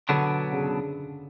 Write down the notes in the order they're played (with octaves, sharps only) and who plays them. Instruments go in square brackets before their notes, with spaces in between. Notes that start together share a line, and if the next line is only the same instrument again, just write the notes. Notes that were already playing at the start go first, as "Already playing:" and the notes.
[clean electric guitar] B2 F#3 B3 D4 [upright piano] D3
[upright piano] C#3